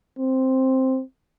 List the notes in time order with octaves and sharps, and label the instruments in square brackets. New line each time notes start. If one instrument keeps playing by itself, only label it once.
[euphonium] C4